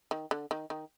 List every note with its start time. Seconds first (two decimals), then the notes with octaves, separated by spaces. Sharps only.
0.11 D#3
0.31 D3
0.51 D#3
0.70 D#3